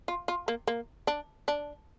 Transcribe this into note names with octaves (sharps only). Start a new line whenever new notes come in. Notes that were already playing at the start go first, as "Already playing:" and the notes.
F4
F4
A#3
A#3
D4
D4